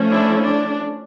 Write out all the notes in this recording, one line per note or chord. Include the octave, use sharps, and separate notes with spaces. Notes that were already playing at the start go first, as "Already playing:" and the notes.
Already playing: F3 A3 C#4
D4 E4
D4